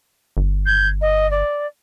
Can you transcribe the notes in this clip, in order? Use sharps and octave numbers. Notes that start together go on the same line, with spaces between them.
G1
G6 G#6
D#5
D5